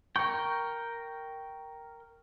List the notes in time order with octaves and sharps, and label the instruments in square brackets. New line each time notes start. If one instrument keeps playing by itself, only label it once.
[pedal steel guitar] A#4 G5 [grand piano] C#6